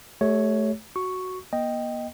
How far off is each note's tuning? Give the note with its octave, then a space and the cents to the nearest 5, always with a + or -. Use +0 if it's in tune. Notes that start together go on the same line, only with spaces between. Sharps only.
A3 -20 G4 +0 C#5 +5
F#4 +0 C#6 +0
A#3 +40 D#5 +0 G5 +0